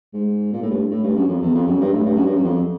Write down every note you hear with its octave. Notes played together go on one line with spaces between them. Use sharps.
G#2
A#2
A2
G2
A2
G2
F#2
F2
E2
F2
F#2
G2
A2
G2
F#2
G2
F#2
F2